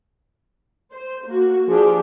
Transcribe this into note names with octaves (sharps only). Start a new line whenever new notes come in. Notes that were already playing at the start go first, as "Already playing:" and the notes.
C5
A#3 F#4
F3 D4 G4 G#4